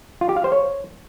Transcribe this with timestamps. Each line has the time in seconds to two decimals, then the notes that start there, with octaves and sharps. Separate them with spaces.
0.21 F4
0.29 G4
0.37 F5
0.44 C5
0.52 C#5